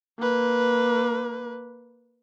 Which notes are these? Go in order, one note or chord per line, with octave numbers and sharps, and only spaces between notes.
A#3 B4